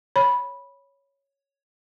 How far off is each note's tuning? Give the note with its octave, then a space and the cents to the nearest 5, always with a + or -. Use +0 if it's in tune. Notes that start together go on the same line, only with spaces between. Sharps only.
C#5 +0 B5 -10